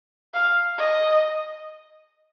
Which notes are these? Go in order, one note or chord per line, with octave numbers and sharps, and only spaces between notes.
F5
D#5